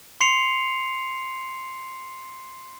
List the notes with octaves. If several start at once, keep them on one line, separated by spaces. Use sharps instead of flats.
C6 C7 C#7 F7